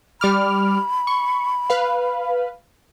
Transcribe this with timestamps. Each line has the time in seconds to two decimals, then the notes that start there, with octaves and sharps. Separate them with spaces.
0.21 G3 B5 D6 F6
1.07 C#6
1.70 B4 F5